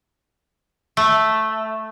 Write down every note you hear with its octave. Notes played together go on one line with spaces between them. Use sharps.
A3